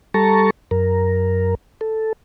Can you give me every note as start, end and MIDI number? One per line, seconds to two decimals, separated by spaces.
0.14 0.50 55
0.14 0.50 69
0.14 0.50 81
0.14 0.50 82
0.14 0.50 85
0.71 1.55 42
0.71 1.55 70
1.81 2.13 69